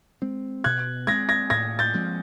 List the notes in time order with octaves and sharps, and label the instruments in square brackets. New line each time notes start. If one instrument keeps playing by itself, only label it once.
[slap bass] G#3 C4
[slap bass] B2 [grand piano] F#6 G#6
[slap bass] G#3 C4 [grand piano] G#6 A#6
[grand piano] G#6 A#6
[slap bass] A2 [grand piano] G#6 A#6
[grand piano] G6 A6
[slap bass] F3 G#3 C4